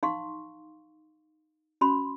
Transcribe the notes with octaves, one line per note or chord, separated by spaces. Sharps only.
D#4 F5 C6 C#6
C#4 F#4 B5 C6